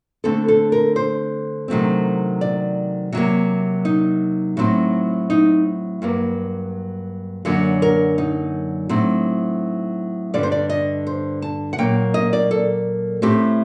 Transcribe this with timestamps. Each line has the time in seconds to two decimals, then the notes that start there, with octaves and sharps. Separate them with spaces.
0.24 D3 A3 C4 A4
0.48 A4
0.72 A#4
0.96 C5
1.68 C3 D#3 F#3 A3 C4
2.41 D5
3.12 C3 F#3 A#3
3.85 D#4
4.57 A2 F#3 C4
5.30 D#4
6.02 G2 F#3 A#3
7.45 F#2 D3 F#3 A#3
7.82 A#4
8.18 D#4
8.89 A2 F#3 C4
10.34 G2 D3 G3 D5
10.43 C5
10.52 D5
10.70 D#5
11.07 C5
11.42 A5
11.73 F#5
11.78 A#2 F#3 A#3 G5
12.14 D#5
12.33 D5
12.51 A4
13.22 A2 A3 C4 G4